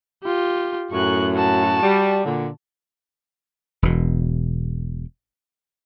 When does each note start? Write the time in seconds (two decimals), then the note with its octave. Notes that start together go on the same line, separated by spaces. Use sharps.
0.24 F4 G4
0.92 F#2 A2 C#6 F#6
1.35 F#4 A5
1.83 G3
2.24 A#2 D3
3.82 E1 B2